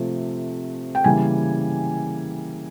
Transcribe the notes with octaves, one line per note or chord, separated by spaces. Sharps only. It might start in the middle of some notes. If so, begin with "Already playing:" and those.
Already playing: C3 F3 A3
G5
C#3 E3 G3 A#3 G#5